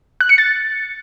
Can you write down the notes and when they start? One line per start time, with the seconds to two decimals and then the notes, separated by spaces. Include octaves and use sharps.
0.21 F#6
0.29 C#7
0.38 A6